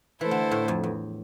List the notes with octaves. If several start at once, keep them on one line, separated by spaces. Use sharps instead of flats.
E3 A3 E4 A4 C5
D3
A2
F2
E2